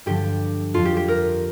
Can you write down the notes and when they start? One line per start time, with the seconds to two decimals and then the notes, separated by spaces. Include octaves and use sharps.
0.06 G2 D3 F3 G4
0.74 F2 F3 F4
0.85 G4
0.97 G4
1.08 A#4